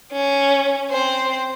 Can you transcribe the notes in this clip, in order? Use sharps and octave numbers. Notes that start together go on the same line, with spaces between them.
C#4
C4 C5